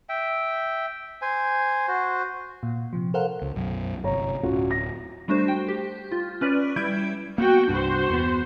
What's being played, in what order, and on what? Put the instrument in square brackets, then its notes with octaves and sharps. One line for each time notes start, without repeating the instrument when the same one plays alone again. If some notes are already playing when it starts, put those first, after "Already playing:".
[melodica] E5 G5
C5 G#5
F#4 C5
[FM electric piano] A#2
C3 F3
A4 A#4 C5 F5 F#5
[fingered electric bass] C#2
B1 F#2
[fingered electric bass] G1 C3 [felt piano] C#5 A#5
[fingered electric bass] D1 [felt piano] C#4 F4 F#4
[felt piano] A#6
[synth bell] G3 A3 D4 F#4 C5
G5
G4
F4
C#4 B4 D5
G3 E4 E5 G6 G#6 D7
[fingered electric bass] A#3 B3 [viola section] F#4 G5
[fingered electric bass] C2 G2 D4 [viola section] F#4 C5
[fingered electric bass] E2 A#3 B3